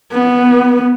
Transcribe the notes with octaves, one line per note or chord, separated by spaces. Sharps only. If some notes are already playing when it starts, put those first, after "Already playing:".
B3